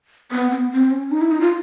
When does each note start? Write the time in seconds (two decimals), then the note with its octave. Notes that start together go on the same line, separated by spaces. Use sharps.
0.32 B3
0.51 C4
0.56 B3
0.72 C4
0.91 C#4
1.12 D#4
1.21 E4
1.31 D#4
1.41 F4